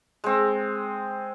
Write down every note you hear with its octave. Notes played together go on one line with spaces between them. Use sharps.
G#3 C4